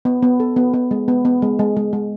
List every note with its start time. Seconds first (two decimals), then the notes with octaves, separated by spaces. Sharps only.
0.05 B3
0.23 B3
0.40 A4
0.56 B3
0.74 B3
0.91 G#3
1.08 B3
1.25 B3
1.42 G#3
1.59 G#3
1.76 G#3
1.93 G#3